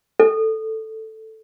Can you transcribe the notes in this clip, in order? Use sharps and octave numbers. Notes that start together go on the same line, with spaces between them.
A4